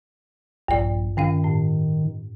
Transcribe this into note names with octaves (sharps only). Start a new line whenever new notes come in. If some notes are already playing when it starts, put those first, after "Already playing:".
A#1 G2 D5
G2 D#3 C#4 F5
A2